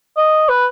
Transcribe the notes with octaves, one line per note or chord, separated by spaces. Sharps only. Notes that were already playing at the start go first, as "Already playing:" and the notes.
D#5
B4